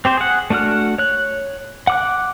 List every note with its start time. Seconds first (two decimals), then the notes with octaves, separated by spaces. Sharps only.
0.05 C4 G4 C5
0.17 G#4 F#5
0.50 A3 D4 F#4 F#5 F6
0.98 C#5 F#6
1.87 F#5 D6 F#6